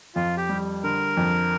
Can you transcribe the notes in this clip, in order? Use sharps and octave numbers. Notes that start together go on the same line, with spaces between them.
F2 F4
G4
G3
D3 A#4
F2